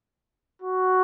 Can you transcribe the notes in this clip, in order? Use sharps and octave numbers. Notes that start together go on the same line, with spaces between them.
F#4